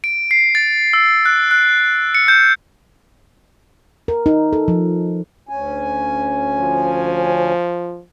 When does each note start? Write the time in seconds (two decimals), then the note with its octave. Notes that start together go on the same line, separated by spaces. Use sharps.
0.04 D7
0.31 C7
0.55 A6
0.93 E6
1.25 F#6
1.51 F#6
2.15 C#7
2.28 G6
4.08 A#4
4.26 D#4
4.53 A4
4.68 F3
5.49 D2 C#4 G#5
6.60 F3